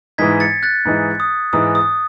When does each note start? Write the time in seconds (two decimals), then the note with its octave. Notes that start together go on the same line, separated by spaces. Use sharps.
0.18 G#2 E3 G#3 D#4 G#6 B6
0.40 A6 C#7
0.63 F#6 A6
0.85 G#2 E3 G#3 D#4
1.20 D#6
1.53 G#2 E3 G#3 D#4 D#6
1.75 D#6